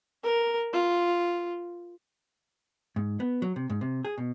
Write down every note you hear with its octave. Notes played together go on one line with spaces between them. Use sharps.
A#4
F4
G#2
B3
F#3
C3
G#2
C3
G#4
B2